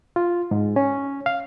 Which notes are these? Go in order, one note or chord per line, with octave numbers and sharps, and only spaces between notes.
F4
G#2
C#4
F5